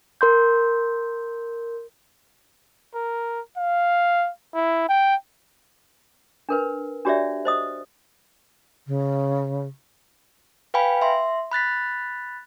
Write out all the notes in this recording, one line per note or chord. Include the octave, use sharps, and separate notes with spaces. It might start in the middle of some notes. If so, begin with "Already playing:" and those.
A#4 C6 G6
A#4
F5
E4
G5
D4 A#4 B4
D4 F#4 G4 C#5 D5 E5
C5 D#5 D#6
C#3
B4 F5 G5 G#5 B5
E5 C6
B5 F#6 A6 B6